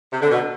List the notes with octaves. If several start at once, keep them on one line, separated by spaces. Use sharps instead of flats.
C3
D3
B2